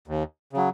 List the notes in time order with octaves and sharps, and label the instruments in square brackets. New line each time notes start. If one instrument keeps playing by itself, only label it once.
[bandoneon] D#2
C#3 F#3